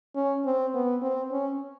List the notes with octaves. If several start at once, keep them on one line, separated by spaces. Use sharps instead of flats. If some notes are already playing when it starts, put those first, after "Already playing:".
C#4
C4
B3
C4
C#4